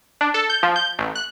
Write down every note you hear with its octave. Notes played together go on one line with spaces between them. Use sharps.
D4
A4
G6
F3
G6
A1
F#6